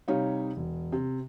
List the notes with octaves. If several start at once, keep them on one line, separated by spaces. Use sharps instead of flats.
C3 G3 D#4 C#5 F5
E1
C3